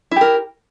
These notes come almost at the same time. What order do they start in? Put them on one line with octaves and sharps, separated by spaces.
E4 G4 A#4